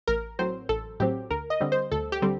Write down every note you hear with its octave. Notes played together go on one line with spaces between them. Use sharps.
A1 A#4
A2 F#3 C4 C5
A1 A4
A2 F#3 C4 G4
D2 A#4
D#5
D3 G3 C4
C5
D2 A4
G4
D3 G3 C4